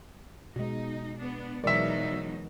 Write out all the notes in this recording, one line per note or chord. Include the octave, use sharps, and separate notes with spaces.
B2 G#3 D#4
B3 D4
B2 E3 F#3 G#3 D#4 A#4 D5 E5